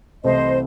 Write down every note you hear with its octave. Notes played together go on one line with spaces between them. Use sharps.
C2 C3 E3 A3 C4 C5 D#5